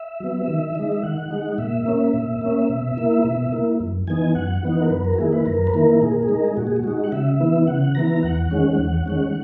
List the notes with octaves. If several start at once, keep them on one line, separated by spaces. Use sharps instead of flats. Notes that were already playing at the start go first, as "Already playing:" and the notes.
Already playing: E5
F#3 B3
D#3
G#3 D#4
E5
D#3 F#5
G#3 D#4
A#2 E5
A#3 C#4
A#2
A#3 C#4
B2
A#3 E4
B2
A#3 E4
F#2
E3 B3 D#4 G#5
F#2 F#5
E3 B3 D#4
A#4
F#2 B4
A#4
F#4
D#3 A#3 E4 G#4
B4
F#2 A#4
B4
D#3 A#3 E4 A#4
A#2 G#4
A#4
G#4
G#3 D#4 A#4
G#4
A#2 F#4
G#4
F#4
G#3 D#4
F#5
C#3 E5
E3 B3 E4
C#3 F#5
E3 B3 E4 A#5
E2 F#5
D#3 G#3 C#4
E2
D#3 G#3 C#4